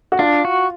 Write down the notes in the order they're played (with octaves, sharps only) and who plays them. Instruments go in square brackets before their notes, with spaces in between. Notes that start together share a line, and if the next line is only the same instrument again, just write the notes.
[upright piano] F#4
[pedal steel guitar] D4 [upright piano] F4
[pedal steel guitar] F#4